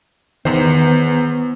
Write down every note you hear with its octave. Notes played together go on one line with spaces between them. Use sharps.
E2 D#3 B3 C5